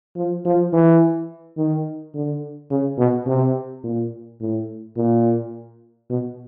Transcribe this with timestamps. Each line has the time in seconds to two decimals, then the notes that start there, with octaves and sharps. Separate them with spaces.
0.16 F3
0.45 F3
0.73 E3
1.57 D#3
2.15 D3
2.71 C#3
2.98 B2
3.27 C3
3.84 A#2
4.40 A2
4.97 A#2
6.10 B2